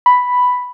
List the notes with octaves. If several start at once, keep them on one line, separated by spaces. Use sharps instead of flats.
B5